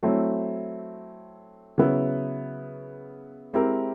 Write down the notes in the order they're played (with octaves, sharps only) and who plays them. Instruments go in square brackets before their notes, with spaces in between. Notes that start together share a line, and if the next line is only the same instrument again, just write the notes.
[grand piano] F#3 A3 C4 E4
C#3 F#3 B3 E4
G#3 C4 E4 G4 A#4